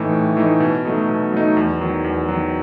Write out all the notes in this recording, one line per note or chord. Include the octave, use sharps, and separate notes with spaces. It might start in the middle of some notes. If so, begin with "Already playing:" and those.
Already playing: A2 E3 A3 D#4
A2
E3 A3 D#4
B2
F#3 A3 D#4
B2
F#3 A3 D#4
E2
D#3 F#3
E2
D#3 F#3